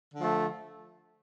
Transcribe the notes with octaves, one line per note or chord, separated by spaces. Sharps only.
D3 F3 A3